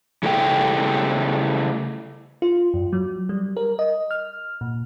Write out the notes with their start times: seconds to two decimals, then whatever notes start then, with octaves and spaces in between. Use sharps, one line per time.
0.23 C#3 A3 E4 G4 B4 G5
2.42 F4
2.74 F#2
2.93 F#3
3.29 G3
3.57 A#4
3.79 D#5
4.11 F6
4.61 A#2